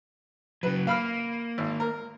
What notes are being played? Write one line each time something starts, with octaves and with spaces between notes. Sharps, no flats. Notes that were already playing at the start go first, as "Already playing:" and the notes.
C#3 F#3 B4
A#3 F5 B5 F6
G#1
A#4